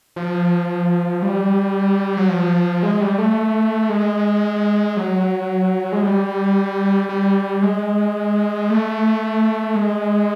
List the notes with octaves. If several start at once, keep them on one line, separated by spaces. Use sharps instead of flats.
F3
G3
F#3
F3
G#3
G3
A3
G#3
F#3
G#3
G3
G3
G#3
A3
G#3